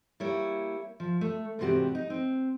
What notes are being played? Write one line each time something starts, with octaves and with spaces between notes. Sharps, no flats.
G3 A#3 E4 C#5
F3
A3
E2 G#2 C3 F#4 G4
D#4
C4